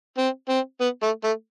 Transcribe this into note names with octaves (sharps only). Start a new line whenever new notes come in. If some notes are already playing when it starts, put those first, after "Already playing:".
C4
C4
B3
A3
A3